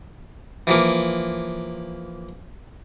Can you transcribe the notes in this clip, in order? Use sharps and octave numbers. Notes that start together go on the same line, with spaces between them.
E3 F3 A#3